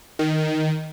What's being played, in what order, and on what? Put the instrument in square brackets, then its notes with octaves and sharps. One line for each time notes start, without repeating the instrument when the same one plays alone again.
[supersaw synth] D#3